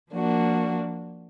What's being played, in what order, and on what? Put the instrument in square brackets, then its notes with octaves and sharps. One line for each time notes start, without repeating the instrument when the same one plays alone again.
[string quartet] F3 A#3 D4 F#4